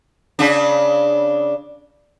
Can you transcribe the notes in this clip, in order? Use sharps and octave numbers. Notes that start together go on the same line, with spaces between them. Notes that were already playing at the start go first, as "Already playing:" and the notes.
C#3 D4